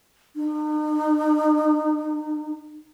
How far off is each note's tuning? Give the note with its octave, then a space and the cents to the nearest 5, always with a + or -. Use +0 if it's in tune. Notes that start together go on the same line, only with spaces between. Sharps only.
D#4 -45